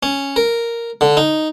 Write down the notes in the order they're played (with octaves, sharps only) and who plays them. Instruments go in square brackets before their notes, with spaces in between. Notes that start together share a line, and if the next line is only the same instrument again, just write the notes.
[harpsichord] C#4
A#4
D3
D#4